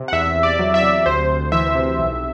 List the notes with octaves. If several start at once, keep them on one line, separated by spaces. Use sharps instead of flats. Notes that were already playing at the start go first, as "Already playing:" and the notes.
Already playing: C3
F#5
E2 E5
E2
D5
F#3
E5
C3
D2 C5
D2
E3 E5
C3
B1